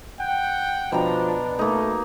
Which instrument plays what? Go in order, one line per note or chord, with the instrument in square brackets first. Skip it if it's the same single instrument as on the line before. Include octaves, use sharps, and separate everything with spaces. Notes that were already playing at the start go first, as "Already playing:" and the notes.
[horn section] F#5 G5
[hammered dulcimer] B2 G5 A#5 [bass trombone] F3 [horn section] D4
[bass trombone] A3 [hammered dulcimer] A#3 D#4